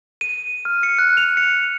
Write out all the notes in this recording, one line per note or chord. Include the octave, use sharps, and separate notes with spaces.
D#7
F6
C#7
F#6
F7
C#7